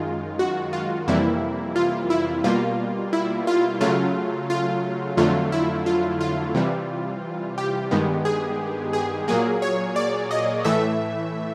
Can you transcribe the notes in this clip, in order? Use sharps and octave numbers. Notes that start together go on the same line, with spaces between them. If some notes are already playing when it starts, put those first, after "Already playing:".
Already playing: F#2 D#3 G#3 F4
F#4
F4
F2 C3 E3 G3 A#3 E4
F4
E4
B2 G3 A#3 F4
E4
F4
C#3 F#3 A3 F4
F4
F2 D3 F#3 A3 F4
E4
F4
F4
C3 E3 G3
G4
G2 D#3 G#3 B3
G#4
G#4
A#2 F#3 A#3 G#4
C#5
D5
D#5
A2 E3 A3 E5